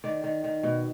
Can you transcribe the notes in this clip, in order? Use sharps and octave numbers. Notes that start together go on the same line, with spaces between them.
D#3 D5
D#3
D#3
B2